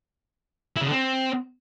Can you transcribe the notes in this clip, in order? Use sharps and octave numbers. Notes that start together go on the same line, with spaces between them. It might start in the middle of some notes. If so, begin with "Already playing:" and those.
E4
C#3
D3
C4